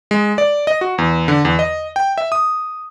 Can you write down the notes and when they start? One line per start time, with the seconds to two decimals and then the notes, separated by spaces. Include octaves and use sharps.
0.11 G#3
0.38 D5
0.67 D#5
0.81 F#4
0.98 E2
1.28 D3
1.45 E2
1.59 D#5
1.96 G5
2.18 E5
2.32 D#6